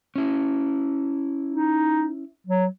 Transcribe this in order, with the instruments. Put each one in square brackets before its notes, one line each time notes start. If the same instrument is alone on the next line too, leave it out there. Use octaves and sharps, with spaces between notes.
[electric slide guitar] C#4 E4
[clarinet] D#4
F#3